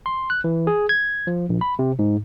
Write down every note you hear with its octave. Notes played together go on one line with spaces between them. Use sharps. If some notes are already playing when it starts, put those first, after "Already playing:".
C6
F#6
E3
G#4
G#6
F3
A#1
B5
C3
G#2